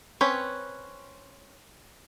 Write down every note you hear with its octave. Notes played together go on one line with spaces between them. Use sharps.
C4 C#4 B4 C#5